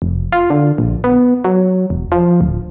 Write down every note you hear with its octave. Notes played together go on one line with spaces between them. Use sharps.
F1
F4
D3
A#1
B3
F#3
E1
F3
D1